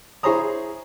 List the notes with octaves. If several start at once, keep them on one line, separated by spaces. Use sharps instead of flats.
E4 G#4 C5 C#5 A#5 D#6